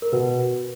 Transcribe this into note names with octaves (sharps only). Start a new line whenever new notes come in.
A#4
B2 B4